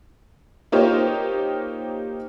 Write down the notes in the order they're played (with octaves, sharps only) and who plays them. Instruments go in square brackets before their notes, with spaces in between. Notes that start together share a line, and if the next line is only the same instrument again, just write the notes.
[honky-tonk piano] A#3 D#4 F4 G4 C5 C#5